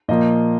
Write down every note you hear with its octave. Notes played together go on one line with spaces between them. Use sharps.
A#2 F3 A#3 D#5